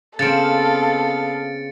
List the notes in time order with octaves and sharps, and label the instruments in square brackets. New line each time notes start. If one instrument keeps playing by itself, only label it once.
[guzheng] C#3 C4 [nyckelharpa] B3 F5 [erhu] A4 [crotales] A6 C#7 D7